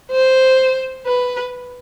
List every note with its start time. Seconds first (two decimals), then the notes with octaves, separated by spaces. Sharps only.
0.12 C5
1.06 B4